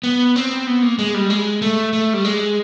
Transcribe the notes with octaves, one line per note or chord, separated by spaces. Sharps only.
B3
C4
B3
A#3
G#3
G3
G#3
A3
A3
G3
G#3